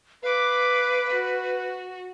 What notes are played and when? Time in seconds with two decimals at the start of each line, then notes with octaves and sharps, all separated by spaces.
0.23 B4 F5 D6
1.08 F#4